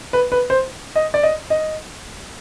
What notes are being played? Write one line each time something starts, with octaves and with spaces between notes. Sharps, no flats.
B4
B4
C5
D#5
D5
D#5
D#5